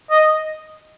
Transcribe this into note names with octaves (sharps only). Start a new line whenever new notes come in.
D#5